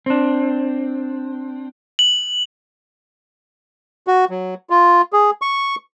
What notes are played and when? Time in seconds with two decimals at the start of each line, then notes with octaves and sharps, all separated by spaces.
0.06 C4 D4
1.99 F#7
4.07 F#4
4.30 F#3
4.70 F4
5.13 G#4
5.42 C#6